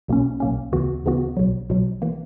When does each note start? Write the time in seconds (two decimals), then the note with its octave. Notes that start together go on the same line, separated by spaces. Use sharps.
0.08 B1 B2 A#3 C#4
0.40 B1 B2 A#3 C#4
0.72 D2 C#3 E3 B3 F#4
1.04 D2 C#3 E3 B3 F#4
1.37 B1 B2 F#3
1.69 B1 B2 F#3
2.02 E3 A#3